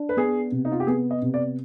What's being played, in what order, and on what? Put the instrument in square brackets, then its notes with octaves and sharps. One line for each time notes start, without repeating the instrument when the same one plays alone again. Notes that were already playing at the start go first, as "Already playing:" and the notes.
Already playing: [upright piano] D4
[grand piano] B4
[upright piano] B3 [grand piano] G#4
[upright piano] C3
[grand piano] D#4
F4
G4
[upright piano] B3 [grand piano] G#4
[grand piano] D#5
[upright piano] C3
[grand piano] D5